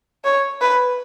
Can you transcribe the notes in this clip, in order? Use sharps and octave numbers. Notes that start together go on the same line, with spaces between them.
C#5
B4